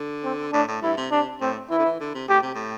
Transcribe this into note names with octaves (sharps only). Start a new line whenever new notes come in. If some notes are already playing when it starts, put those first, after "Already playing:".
Already playing: D3
C4
A2 D4
A2
G2 E4
C3
C3 D4
A2 C4
E3 E4
D3
E3
D3
C3
A2 G4
C3
A2